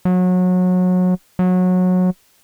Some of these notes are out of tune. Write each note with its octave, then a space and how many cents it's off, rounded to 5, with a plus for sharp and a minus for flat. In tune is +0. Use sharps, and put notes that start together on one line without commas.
F#3 -25
F#3 -20